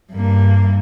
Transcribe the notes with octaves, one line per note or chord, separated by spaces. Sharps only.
G2 A#3